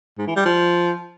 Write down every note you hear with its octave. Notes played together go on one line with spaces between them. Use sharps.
G#2
E3
G3
F3